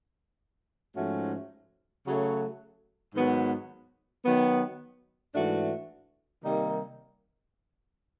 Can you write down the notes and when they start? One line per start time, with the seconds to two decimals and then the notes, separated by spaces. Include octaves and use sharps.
0.96 G#2 F3 A3 C#4 F#4
2.05 C#3 F#3 A3
3.15 G#2 D#3 F#3 B3
4.24 D#3 F#3 B3
5.34 G#2 E3 A3 D4 F#4
6.43 C3 D#3 G3 A#3 D#4